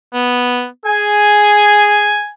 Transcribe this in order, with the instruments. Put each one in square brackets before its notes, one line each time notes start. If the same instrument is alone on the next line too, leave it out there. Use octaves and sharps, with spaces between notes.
[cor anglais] B3
[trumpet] G#4 [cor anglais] G#5